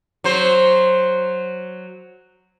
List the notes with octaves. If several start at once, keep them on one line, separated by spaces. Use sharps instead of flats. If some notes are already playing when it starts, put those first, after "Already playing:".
F#3 C5